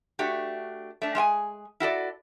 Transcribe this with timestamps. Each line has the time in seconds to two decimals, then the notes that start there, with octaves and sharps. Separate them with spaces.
0.19 A3 D4 F#4 G4
1.02 A3 D4
1.15 G#3 G#4 G5 G#5
1.80 E4 F#4 A4 D5